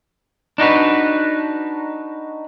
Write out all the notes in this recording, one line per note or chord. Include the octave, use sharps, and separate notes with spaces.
D4 D#4 F#4 B4